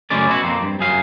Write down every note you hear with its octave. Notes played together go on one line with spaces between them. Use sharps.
F#2 A2 C#3 G#3 C#4 D5
B2 E4 F#4
F2 A#3 C4
G2
F#2 G#4 F5